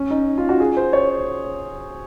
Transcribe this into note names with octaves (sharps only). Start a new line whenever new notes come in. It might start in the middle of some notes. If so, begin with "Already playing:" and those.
Already playing: C#4
D#4
F4
F#4
G#4
C5
C#5